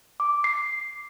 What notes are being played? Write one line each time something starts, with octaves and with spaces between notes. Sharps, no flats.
D6
C7